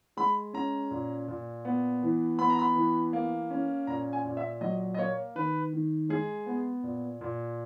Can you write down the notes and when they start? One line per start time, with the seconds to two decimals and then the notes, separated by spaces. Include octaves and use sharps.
0.17 G#3 B5
0.53 C#4 A#5
0.91 A#2
1.28 A#2
1.65 B3
2.03 E3
2.39 B3 B5
2.50 A#5
2.59 B5
2.76 E3
3.13 A#3
3.50 C#4
3.87 A#2 A#5
4.13 G#5
4.25 A#2
4.37 E5
4.61 F#3 D#5
4.94 D#5
4.98 A#3 C#5
5.35 D#3 B4
5.73 D#3
6.09 G#3 G#4
6.46 B3
6.83 A#2
7.21 A#2